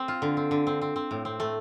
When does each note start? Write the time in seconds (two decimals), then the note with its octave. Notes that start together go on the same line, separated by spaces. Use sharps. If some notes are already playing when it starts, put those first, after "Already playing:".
Already playing: C4
0.08 F4
0.22 D3
0.37 C4
0.51 D3
0.67 C4
0.82 C4
0.96 C4
1.11 A2
1.25 C4
1.40 A3